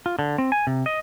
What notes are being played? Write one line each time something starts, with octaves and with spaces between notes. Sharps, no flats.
F4
D3
C4
G#5
C3
D#5